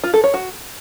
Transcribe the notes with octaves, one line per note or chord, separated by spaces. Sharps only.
F4
A4
C#5
F#4